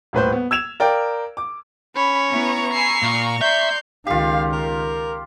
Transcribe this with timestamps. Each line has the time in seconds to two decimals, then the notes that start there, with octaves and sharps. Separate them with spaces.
0.13 D#1 A2 B4 C5
0.32 B3
0.51 E6 G#6 E7 F7
0.80 A#4 D5 F5 G5
1.37 D6
1.96 C#4 C#5 B5
2.30 B3 E4 B4 A#5 C#6
2.73 G#5 B5 E6 C7
3.02 A#2 F5
3.41 D5 E5 C6 G6 C7
4.07 C#2 D#3 F4 G4 F5
4.52 A#4